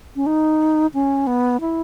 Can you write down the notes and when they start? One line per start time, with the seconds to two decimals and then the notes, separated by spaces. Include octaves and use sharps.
0.16 C#4
0.26 D#4
0.94 C#4
1.27 B3
1.61 E4